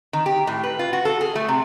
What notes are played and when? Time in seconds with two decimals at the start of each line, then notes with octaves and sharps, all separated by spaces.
0.13 D#3
0.26 G4
0.47 A2
0.64 B4
0.79 F4
0.93 F#4
1.05 A4
1.21 G#4
1.35 A3
1.48 C3